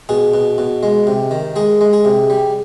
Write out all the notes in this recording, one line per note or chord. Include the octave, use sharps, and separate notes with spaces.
B2 G#4
B2
B2
G#3
C3
D#3
G#3 G#4
G#3
G#4
C3
G3